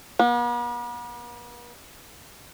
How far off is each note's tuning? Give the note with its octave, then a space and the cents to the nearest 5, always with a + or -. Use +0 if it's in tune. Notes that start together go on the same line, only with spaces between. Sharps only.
B3 -45